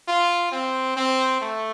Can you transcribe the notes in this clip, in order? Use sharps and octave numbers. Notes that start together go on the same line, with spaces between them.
F4
C4
C4
A3